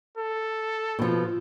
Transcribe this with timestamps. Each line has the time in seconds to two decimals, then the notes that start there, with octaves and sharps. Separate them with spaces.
0.17 A4
0.99 B2 F3